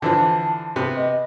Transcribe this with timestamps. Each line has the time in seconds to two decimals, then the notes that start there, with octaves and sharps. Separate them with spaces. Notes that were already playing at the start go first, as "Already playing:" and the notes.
0.02 D3 E3 F3 A5
0.76 C3 B3 B4
0.97 D#5